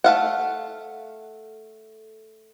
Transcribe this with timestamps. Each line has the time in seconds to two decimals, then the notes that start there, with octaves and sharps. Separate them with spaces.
0.04 A3 F5 F#5